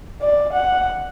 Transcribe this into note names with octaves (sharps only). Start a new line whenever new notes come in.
D5
F#5